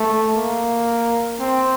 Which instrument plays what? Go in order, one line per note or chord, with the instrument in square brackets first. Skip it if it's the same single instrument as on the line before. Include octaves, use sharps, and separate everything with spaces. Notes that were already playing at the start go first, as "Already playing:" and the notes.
Already playing: [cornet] A3
A#3
C4